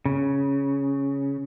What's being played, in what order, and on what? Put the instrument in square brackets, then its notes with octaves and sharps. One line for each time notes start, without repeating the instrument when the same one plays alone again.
[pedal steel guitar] C#3